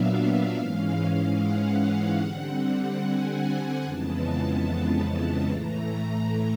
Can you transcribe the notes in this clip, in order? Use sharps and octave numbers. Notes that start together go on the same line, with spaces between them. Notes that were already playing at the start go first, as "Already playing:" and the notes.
Already playing: A#2 F#3 B3 D4 E5 F5
G#2 E3 G#3 C#4 F5
F#5
D3 G3 C4
G#5
F2 C#3 E3 G#3 B3 A5
A2 E3 A3 A#5
A#5